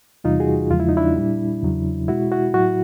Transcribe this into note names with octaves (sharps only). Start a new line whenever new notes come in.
E2 C3 E3 G3 D#4 F4
F#4 G#4
E2 C#3 F3 G#3 F4
E4
D#4
D4 E4
A#2 G3
E2 C#3 F#3
B2 G#3 E4 F#4
E4 F#4
A2 F#3 E4 F#4